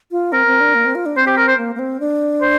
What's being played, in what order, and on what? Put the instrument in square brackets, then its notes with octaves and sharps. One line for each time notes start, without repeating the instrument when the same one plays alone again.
[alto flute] F4
[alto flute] C4 [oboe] A#4
[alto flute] C4
D4
A#3
C4
F4
D4
[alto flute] C4 [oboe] C5
[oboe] G4
A#4
C5
[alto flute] A#3
A#3
C4
D4
[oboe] C5